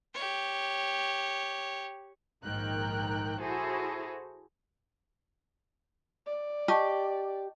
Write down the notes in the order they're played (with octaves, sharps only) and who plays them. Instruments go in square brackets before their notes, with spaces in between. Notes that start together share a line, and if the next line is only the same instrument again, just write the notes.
[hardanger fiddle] G4 C#5
[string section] A#1 G#2 D#3 A#4 G5 F#6
E4 F#4 G#4 A4 C5
[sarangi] D5
[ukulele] G4 [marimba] D#5 A5 C#6